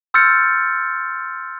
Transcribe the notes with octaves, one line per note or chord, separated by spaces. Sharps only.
C6 E6 F6 G6 A6 C#7